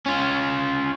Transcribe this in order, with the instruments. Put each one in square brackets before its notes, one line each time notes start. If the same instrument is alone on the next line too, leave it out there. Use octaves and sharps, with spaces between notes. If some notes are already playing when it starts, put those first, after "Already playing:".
[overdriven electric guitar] C#4 F4